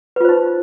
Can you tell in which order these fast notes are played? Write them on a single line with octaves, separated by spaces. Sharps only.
B4 F4 C5 D#4